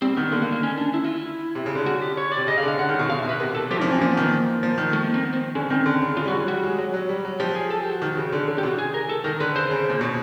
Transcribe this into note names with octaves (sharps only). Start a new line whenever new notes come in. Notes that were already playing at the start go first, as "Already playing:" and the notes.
G3 C4
D#3 B3
D3 A#3
A#3
A#3
C#4
D4
E4
F4
E4
C3
C#3
D3
F#4
G4
C#5
D5
C3
C#3 D#5
C#3 F5
D3
F5
D3 F#5
D#3
B2
B2 F5
E5
B2
B4
C3 A#4
A4
F3 G4
F3 C#4
E3
C4
F3 A#3
B3
D#3
A#3
F3
D#3
A3
A#3
C4
B3
C4
D3 C#4
D#3 C4
D3
C#3
C#3 F4
G3
F#4
F#3
G3 F#4
G#3
F#3
F#3
G3
F#3
F3 G4
G#4
A4
G4
F#4
D#3
C#3
D3
D3
G4
C3 F#4
G#4
A#4
A4
D#3 A#4
D3 B4
C#3 C5
C#3
A#2
B2